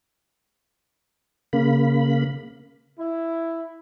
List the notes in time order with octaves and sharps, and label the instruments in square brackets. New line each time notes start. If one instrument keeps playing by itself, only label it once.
[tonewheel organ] C#3 A#3 B5
[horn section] E4